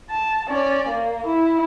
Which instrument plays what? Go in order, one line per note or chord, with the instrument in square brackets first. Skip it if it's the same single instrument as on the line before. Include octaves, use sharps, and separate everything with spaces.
[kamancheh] A5
C#4 D5
A#3
E4